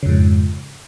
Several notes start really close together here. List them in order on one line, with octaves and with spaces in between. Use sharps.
C#3 F2 G#2